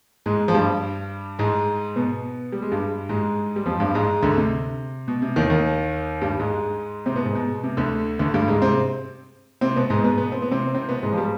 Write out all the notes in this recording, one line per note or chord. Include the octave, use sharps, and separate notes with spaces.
G#2 G#3
F3
G2 G3
G#2 G#3
B2 B3
G3
G#3
G2 G3
G#2 G#3
G3
F2 F3
G2 G3
G#2 G#3
D2 D3
C3
B2
C3
D#2 D#3
D#2 D#3
G2 G3
G#2 G#3
C3 C4
B2 B3
G#2 G#3
B2
C3
D2 D3
D2 D3
G2 G3
G#2 G#3
C3 C4
C3 C4
B2 B3
G#2 G#3
B2 B3
B2 B3
C4
B3
C3 C4
C3 C4
B2 B3
G#2 G#3
F3
G3